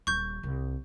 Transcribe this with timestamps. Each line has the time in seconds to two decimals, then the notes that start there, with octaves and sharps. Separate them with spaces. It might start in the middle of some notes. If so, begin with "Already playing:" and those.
0.07 D#1 G3 C#6 G6
0.43 C2